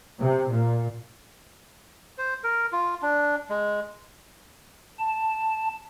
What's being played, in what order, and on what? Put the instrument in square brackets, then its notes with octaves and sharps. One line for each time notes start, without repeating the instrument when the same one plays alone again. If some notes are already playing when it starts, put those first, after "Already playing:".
[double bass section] C3
A#2
[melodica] C5
A#4
F4
D4
G#3
[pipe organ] A5